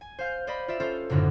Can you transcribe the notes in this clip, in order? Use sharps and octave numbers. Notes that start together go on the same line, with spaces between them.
G#5
C5 F5 G6
C5 D5 D#5 B5
F4 D5 E5
C#4 F4 A4 C5
F#1 F#2 A2 D3 D4 D#4